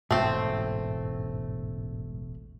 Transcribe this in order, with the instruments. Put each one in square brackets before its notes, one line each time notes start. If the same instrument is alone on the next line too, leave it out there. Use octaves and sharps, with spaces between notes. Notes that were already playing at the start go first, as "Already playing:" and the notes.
[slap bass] E1 A1 C#3 [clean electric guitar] G#2 [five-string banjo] A3 C4